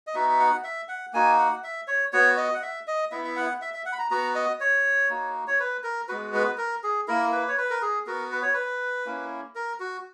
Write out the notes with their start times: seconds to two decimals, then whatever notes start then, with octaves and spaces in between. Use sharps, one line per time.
0.07 D#5
0.14 B3 D#4 F#4 E5
0.30 E5
0.39 F#5
0.64 E5
0.89 F#5
1.13 A#3 D#4 F#4 G#5
1.38 F#5
1.64 E5
1.87 C#5
2.12 B3 F#4 C#5
2.37 D#5
2.54 F#5
2.62 E5
2.87 D#5
3.11 B3 E4 E5
3.25 E5
3.36 F#5
3.62 E5
3.74 E5
3.85 F#5
3.92 B5
3.99 A#5
4.10 B3 F#4 A#5
4.35 D#5
4.60 C#5
5.09 A#3 D#4 F#4
5.47 C#5
5.60 B4
5.84 A#4
6.08 G#3 B3 F#4 B4
6.34 B4
6.58 A#4
6.83 G#4
7.08 A#3 E4 A#4
7.32 B4
7.48 C#5
7.58 B4
7.70 A#4
7.82 G#4
8.06 B3 F#4 A#4
8.32 B4
8.42 C#5
8.53 B4
9.06 A#3 C#4 E4
9.55 A#4
9.80 F#4